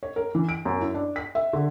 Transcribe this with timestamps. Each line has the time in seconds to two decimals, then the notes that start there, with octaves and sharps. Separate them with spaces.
0.03 C#5
0.16 A#4
0.35 E3
0.49 D7
0.65 F#2
0.81 E4
0.94 D4
1.16 B6
1.35 E5
1.53 D3